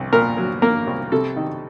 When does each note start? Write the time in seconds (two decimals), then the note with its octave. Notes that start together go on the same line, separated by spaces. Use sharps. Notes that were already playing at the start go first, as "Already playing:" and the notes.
Already playing: C2
0.13 A#2 A#4
0.37 F#3
0.62 A#3 A#4
0.87 C2
1.12 C3 A4
1.36 D#3